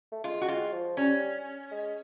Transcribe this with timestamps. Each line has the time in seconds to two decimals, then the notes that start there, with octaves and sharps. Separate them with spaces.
0.12 A3
0.24 G#3 F4
0.41 F#4
0.48 G#3 F4
0.73 F3
0.97 G3 C#4
1.71 G#3